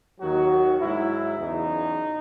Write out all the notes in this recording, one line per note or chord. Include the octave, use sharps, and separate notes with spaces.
D#2 D#3 F#3 F#4
G#2 F#3 E4
E2 C#3 F#3 D#4